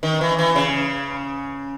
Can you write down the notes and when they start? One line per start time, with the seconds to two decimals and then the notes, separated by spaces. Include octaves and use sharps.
0.03 D#3
0.21 E3
0.39 E3
0.56 C#3